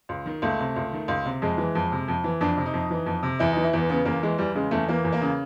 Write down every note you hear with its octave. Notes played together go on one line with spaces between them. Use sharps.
C#2
D#3
C#2 A3
C3
C#2
D#3
C#2
C3
F2 G#3
E3
F2
C3
F2
E3
F2 D4
C3
D#4
F2
E3
F2
C3
E2 E4
D#4
E3
E4
E2 B3
C#3 B3
E2 A#3
E3 G#3
E2 G3
C#3 G#3
E2 A3
E3 A#3
E2
A#3
C#3